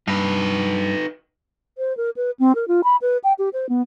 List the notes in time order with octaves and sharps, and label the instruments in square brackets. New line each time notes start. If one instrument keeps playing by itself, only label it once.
[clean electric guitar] G2 [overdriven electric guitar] D#4 B4
[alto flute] C5
A#4
B4
C4
A#4
F4
B5
B4
G5
G4
C5
B3